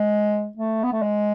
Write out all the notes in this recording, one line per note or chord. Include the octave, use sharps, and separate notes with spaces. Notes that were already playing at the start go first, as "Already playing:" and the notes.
Already playing: G#3
A3
B3
A3
G#3